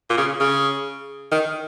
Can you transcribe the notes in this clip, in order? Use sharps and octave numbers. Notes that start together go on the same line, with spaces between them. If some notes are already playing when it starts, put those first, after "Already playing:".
A#2
C#3
C#3
D#3